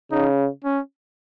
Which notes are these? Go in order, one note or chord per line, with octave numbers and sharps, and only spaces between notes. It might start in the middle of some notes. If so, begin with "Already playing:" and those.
C#3 D#4
C#4